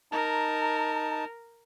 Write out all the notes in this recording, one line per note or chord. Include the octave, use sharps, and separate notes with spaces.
D#4 A#4 A5